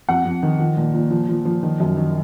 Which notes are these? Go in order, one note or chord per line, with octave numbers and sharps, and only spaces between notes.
F2 F#5
F2
D#3
F3
A#2
A#2
F3
F3
F3
D#3
F#2
D#3